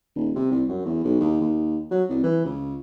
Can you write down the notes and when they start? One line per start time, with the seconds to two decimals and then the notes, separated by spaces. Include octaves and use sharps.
0.15 D#1
0.35 C3
0.51 C2
0.69 F#2
0.85 E2
1.04 B1
1.20 D#2
1.41 D#2
1.91 F#3
2.09 C2
2.23 E3
2.45 C#2